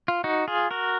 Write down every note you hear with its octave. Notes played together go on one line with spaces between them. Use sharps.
F4
D#4 F#4
F4 G#4
F#4 A#4